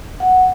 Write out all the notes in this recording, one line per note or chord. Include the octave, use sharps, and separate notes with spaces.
F#5